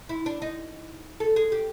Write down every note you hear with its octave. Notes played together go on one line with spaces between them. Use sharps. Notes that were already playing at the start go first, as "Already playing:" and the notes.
E4
D4
D#4
A4
G#4
G4